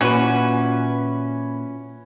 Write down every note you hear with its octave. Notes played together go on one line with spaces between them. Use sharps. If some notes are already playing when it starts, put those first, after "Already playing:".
A#2 E3 C#4 F#4 B4